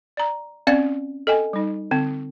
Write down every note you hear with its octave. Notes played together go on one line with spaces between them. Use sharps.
D5 A#5
C4 C#4 D5 F5
A4 D#5 G5 G#5
G3 D#4
D3 C4